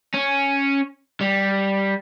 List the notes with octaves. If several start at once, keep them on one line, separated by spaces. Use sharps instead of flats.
C#4
G3